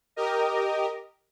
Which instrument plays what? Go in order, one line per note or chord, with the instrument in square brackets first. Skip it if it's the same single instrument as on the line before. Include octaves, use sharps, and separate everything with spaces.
[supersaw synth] G4 A#4 D#5